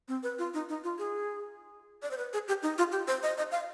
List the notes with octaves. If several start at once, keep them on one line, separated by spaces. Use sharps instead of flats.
C4
B4
F4
D#4
D#4
F4
G#4
D5
C5
B4
G#4
G4
D#4
F4
G4
C5
D#5
D#5
F5